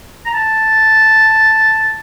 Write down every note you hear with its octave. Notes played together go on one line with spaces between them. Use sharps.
A#5
A5